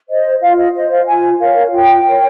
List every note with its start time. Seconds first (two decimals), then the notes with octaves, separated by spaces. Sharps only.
0.08 C5 D#5
0.42 F4 F5
0.57 D#5
0.74 C5 D#5
0.91 F5
1.07 F4 G#5
1.40 A#4 C#5 F5
1.72 F4 G5
2.05 A#4 C#5